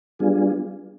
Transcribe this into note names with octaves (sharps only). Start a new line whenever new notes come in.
G3 B3 D4 F4 G#4